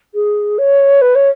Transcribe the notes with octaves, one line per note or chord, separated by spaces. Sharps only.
G#4
C#5
B4
C#5